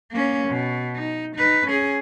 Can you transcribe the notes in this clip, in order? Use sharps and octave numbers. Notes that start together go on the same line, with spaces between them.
A#3 C#4
B2
D#4
D#4 B4
C#4 G#4